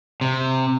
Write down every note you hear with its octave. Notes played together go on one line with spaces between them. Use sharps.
C3